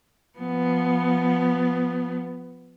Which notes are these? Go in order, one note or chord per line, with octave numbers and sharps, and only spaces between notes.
F3 B3